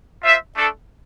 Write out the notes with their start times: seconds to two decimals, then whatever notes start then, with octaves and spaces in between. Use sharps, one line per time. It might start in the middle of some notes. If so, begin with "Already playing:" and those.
0.22 F4 C5 E5
0.55 A3 D4 A4